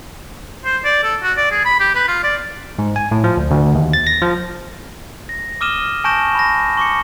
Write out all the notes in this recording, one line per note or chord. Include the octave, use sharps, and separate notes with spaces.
C5
D5
A4
F#4
D5
G#4
B5
G4
B4
F4
D5
G#2
G#5
A2
F3
D2
D2
D#2
A6
A#6
F3
A#6
D6 D#6 F6 D#7 E7 G7
G#5 A5 C#6 G6 A#6 E7
B5 A#6
C#6 D6 C#7